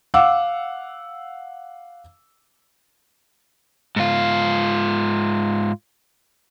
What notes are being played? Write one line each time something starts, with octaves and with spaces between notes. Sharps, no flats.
F5 F#5 D6 E6
G#2 F4